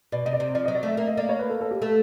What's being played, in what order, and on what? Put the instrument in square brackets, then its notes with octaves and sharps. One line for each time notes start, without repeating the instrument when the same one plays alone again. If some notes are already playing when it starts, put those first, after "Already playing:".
[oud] B2 [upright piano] D5
[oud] C3 [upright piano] D#5
[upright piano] D5
[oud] C3
[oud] F3 [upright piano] D5
[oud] F#3 [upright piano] D#5
[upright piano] D5
[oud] A3 [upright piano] E5
[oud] A#3 [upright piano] E5
[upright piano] D#5
[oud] A#3 [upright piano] D5
[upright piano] C#5
B4
A4
A4
G4
[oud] A3 [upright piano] A4